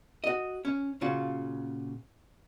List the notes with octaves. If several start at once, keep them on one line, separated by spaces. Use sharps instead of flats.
F#4 D#5
C#4
A#2 C#3 F4 F#4